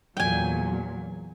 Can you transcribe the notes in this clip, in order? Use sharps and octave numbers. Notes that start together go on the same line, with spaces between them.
E2 A#2 F#3 G5 G#5